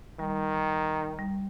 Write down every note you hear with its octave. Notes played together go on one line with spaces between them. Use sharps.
D#3 G3
G3